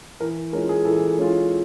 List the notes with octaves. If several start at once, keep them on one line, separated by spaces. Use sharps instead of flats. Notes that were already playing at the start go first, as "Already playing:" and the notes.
E3 A#4
G#3 C#4 F4 A#4
G#4
E3 A4
G#3 C#4 F4